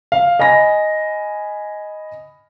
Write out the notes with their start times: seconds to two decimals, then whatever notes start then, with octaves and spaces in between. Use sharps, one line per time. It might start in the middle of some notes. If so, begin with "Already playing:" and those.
0.12 F5
0.39 D#5 G#5 B5 A#6